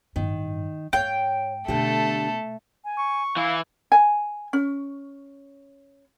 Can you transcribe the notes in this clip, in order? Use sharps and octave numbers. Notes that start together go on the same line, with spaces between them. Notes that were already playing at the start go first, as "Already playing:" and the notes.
A1 G2 D#3
G#2 C#5 F5 G5
B2 D3 A3 G4 A4
G#5
C#6
E3 E4 F5
G#5
C#4